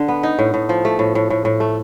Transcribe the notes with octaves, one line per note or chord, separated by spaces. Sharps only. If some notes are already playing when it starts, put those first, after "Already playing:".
Already playing: D3
B3
D#4
A2
A2
F3
A3
A2
A2
A2
A2
A3